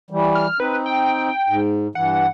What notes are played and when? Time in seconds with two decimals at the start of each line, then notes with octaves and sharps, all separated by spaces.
0.10 E3 G3
0.35 F6
0.60 C4 D#4 B4
0.86 G5
1.49 G#2
1.95 G2 E3 F#5